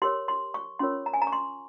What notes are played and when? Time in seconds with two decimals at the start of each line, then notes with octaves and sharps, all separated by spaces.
0.02 G4 A#4 C#5 C6
0.28 C6
0.54 C#6
0.79 C#4 F4 A#4 C#5 C6
1.06 A#5
1.14 G#5
1.22 A#5
1.27 C#6
1.32 C6